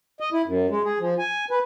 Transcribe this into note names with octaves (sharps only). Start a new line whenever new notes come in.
D#5
E4
F#2
G#3
G#4
F3
G#5
B4